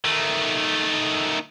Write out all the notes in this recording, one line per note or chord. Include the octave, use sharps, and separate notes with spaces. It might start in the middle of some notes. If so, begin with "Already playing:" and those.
D#3 A3